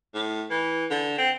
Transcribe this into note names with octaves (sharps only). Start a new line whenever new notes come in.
A2
E3
D3
C4